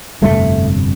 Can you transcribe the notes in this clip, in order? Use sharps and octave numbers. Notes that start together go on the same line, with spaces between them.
G1 F2 C3 A3